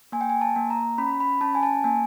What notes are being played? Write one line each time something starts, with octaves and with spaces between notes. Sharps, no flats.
A#3 G#5
G5
G#5
A5
A#3
A#5
C#4 B5
B5
C#4 A5
G#5
A5
A#3 G#5